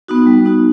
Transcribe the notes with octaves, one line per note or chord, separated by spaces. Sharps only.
B3 D#4 F#4
G3
B3 D#4 F#4